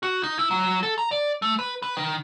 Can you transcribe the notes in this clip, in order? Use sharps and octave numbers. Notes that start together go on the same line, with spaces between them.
F#4
D#4
E4
F#3
A4
A#5
D5
A3
B4
B4
D#3